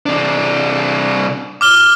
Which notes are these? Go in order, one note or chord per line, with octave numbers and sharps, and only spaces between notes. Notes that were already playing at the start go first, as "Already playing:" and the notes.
C3 D4
D6 F6 G7